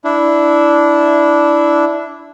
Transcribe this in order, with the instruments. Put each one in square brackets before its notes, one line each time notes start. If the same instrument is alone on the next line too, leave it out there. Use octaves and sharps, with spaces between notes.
[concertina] D4 E4